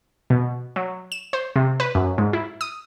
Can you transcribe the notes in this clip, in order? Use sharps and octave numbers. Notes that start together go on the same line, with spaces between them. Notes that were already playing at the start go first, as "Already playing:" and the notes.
B2
F#3
E7
C5
C3
B4
F#2
G#2
E4
D#6